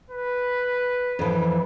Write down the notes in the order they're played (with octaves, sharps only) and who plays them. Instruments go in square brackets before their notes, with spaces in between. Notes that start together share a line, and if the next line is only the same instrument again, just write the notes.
[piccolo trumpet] B4
[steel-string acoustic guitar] F2 E3